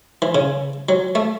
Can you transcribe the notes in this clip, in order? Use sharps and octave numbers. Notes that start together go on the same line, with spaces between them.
E3
C#3
F#3
A3